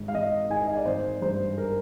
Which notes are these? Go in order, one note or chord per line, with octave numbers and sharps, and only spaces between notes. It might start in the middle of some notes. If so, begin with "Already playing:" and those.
Already playing: G#1 G#2
F5
G#1 D#5
D#3 G#5
D#5
D5
G#1 C5
G2 C5
A#4